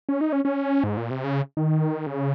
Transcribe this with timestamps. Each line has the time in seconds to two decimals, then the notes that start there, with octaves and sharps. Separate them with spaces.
0.09 C#4
0.21 D#4
0.32 C#4
0.45 C#4
0.84 G#2
0.97 A#2
1.10 C3
1.24 C#3
1.57 D#3
2.06 C#3